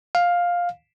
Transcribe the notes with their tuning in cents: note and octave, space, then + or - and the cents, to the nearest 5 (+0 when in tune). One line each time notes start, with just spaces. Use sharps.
F5 +10